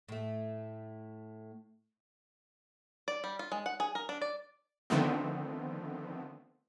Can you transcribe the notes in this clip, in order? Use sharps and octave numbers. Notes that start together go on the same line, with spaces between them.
A2 A3
D5
G3
F4
G#3
F#5
G#4
A#4
D4
D5
D3 D#3 F3 A3 B3 C4